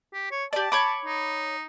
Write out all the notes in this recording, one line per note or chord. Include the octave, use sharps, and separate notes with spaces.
G4
C#5
G4 D5 A5
C#5 B5 D6
D#4